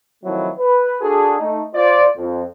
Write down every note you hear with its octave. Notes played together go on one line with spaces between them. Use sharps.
D#3 F3 F#3 A3 C4 E4
B4
D4 F#4 G#4 A4
A3 D#4
F4 C5 D5
F2